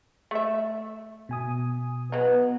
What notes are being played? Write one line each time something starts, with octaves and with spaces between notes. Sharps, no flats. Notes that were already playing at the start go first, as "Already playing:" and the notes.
A3 E5
B2 G#5 D#6
F#3 B3 D#4